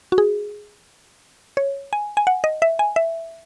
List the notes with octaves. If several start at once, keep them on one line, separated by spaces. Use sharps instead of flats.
F#4
G#4
C#5
G#5
G#5
F#5
D#5
E5
G#5
E5